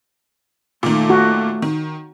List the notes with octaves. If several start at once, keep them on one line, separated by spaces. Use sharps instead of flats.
A#2 D#3 A3
F#4
D#3